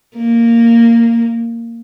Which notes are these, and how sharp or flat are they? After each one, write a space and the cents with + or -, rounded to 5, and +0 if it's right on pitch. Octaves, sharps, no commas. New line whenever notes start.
A#3 -10